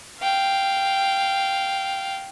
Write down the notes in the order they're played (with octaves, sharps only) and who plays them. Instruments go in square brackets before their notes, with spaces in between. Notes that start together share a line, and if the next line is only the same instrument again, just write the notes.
[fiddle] F5 G5